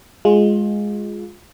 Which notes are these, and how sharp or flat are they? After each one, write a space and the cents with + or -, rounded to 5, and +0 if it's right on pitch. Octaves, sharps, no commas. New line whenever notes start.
G#3 +0 F4 +20